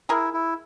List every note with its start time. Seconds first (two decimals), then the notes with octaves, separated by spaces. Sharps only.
0.09 E4 G#4 A#4
0.33 E4